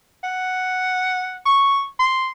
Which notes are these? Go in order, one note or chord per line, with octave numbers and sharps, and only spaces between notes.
F#5
C#6
C6